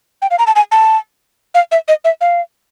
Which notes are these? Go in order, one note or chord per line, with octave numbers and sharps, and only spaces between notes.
G5
F5
A#5
A5
G#5
A5
F5
E5
D#5
E5
F5